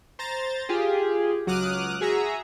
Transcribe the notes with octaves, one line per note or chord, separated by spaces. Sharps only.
C5 A#5 A6
F4 G4 G#4
C#2 F#3 D6 D#6 F6 F#6
F#4 G#4 E5 A#5